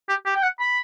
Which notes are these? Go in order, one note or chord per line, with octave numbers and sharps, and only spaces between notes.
G4
G4
G5
F#5
B5